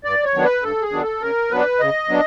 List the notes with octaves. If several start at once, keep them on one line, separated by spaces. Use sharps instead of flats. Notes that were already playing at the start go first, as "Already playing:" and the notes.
G2 D5
C#5
D#3 F#3 B3 D4
B4
G2 A4
G#4
D#3 F#3 B3 D4
A4
C#3 A#4
F#3 B3 D4 B4
C#3 D#5
F#3 B3 D4